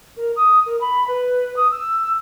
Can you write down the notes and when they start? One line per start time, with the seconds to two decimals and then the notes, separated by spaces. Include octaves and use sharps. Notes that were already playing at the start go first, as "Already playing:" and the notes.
0.17 A#4
0.36 D#6
0.66 A#4
0.81 B5
1.08 B4
1.56 D#6
1.71 E6